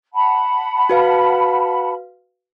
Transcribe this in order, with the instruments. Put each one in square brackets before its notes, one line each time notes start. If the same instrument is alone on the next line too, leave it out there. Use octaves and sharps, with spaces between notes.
[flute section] F#5 A5 B5
[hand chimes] F#4 B4 F5